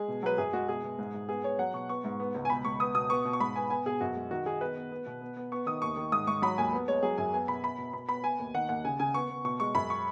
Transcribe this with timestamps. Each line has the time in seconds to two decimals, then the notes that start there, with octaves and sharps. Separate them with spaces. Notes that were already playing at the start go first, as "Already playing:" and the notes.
Already playing: G#3 G#4
0.08 B2
0.23 F#3 B4
0.38 F#2 G#4
0.53 G#3 F#4
0.68 B2 G#4
0.84 B2
0.98 G#2
1.14 G#2
1.28 B3 G#4
1.44 B3 C#5
1.59 F#3 F#5
1.74 B2 C#6
1.89 B3 C#6
2.04 G#2
2.20 B3
2.34 C#2
2.45 G#5
2.49 B2 B5
2.65 C#2 C#6
2.80 B3 D#6
2.95 B2 D#6
3.10 B3 C#6
3.25 B2
3.33 C#6
3.40 G#2 B5
3.55 B3 G#5
3.70 B3 G#5
3.86 B2 G#4
4.01 F#2 F#4
4.16 G#3
4.31 D#3 F#4
4.46 D#3 G#4
4.61 B3 B4
4.76 B3
4.92 B3
5.06 B2
5.22 B3
5.37 B3
5.52 B3 C#6
5.66 D#3 D#6
5.82 D#2 C#6
5.97 D#3
6.12 G#2 D#6
6.27 G#2 C#6
6.42 F#3 B5
6.58 D#2 G#5
6.73 B3
6.88 G#3 C#5
7.03 F#3 G#4
7.18 F#2 G#5
7.33 B3 G#5
7.48 B2 B5
7.63 B3 B5
7.78 B2
7.93 B2 B5
8.09 B3 B5
8.24 B3 G#5
8.39 D#2
8.54 D#3 F#5
8.69 D#2 F#5
8.85 C#3 G#5
8.99 C#3 G#5
9.14 B3 C#6
9.30 B3
9.45 B2 C#6
9.60 G#3 C#6
9.75 F#2 B5
9.90 C#6